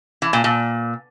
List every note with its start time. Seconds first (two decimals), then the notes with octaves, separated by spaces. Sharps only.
0.22 E3
0.33 A#2
0.44 A#2